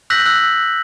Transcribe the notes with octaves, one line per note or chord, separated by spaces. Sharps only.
E6 F#6 G6 A#6 B6 F#7
E6 F#6